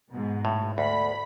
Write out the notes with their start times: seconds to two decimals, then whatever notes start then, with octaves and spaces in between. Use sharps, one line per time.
0.12 G#2 B2
0.45 A2
0.78 D2 B5